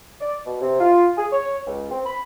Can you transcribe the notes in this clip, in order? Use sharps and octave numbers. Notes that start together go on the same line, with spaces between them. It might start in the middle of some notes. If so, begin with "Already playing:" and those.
D5
B2
C3
F4
G#4
C#5
C#2
C4
B5